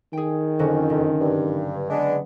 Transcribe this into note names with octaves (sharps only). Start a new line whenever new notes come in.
D#3 G#4 G5
F2 D3 F#3 C#4
F#1
G2
G#3 B3 D4